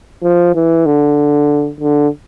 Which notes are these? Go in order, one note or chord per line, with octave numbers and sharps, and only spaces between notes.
F3
E3
D3
D3